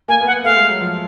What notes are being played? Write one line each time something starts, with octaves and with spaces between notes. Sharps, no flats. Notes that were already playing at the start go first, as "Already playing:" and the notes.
A#3 G#5
B3
F#5
A3 F5
G#3
F#3
F3